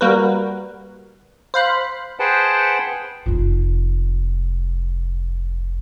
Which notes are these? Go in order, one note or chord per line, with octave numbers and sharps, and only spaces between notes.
G3 A#3 F#4 A#4 B4
C5 F5 B5 F#6
G#4 B4 C5 F#5 G5 A5
F1 F4